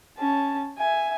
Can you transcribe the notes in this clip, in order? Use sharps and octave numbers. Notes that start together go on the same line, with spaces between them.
C#4 A5
E5 G#5